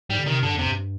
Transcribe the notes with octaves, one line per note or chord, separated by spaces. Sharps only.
G#2 G3
D3
C3 D#3
G2 D3
F2
C3
G2